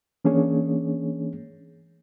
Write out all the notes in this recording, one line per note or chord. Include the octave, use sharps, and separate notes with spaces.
E3 A#3 C#4 D4 G#4 C#5